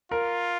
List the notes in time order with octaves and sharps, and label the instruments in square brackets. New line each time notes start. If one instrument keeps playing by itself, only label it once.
[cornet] F4 [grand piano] A#4